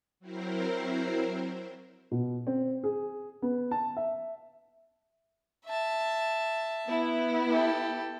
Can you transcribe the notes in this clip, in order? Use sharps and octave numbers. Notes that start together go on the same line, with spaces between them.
F#3 C4 E4 A#4 C5
B2
C4
G#4
B3
A5
E5
E5 A5
B3 E4
G4 A4